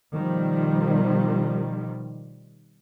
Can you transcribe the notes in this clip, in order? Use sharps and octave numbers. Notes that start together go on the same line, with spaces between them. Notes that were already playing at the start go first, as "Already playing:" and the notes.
B2 D#3 F3 G3